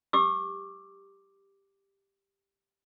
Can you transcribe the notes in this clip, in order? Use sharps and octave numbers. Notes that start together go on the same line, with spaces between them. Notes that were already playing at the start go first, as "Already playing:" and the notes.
G4 D6 E6